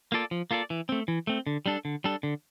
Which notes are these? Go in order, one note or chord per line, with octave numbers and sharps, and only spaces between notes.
A#3 F4 A4 D5
F3
A#3 F4 A4 D5
E3
A3 C4
E3
A3 C4
D3
G3 D4 A4
D3
G3 D4 A4
D3